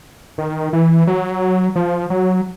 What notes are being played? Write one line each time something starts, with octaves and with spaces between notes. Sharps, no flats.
D#3
E3
F#3
F3
F#3